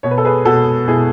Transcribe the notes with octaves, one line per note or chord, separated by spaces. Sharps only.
B2 C#5
B4
A4
G#4 B4
B2 F#4 A4
B2 E4 G#4